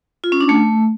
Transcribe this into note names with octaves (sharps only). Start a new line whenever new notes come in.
F4
C#4
D4
A3